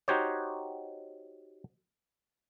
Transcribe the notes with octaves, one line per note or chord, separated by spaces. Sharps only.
D#4 F#4 G4 C5 C#5